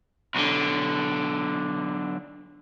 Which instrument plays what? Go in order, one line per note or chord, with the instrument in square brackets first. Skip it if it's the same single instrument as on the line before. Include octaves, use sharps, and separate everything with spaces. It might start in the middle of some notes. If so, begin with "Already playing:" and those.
[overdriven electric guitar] B1 D3